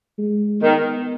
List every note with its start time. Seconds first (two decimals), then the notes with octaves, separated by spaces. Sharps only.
0.18 G#3
0.61 D#3 B3